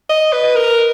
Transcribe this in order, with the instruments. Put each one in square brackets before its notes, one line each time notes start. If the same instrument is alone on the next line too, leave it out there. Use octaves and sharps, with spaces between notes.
[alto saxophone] D#5
B4
A#4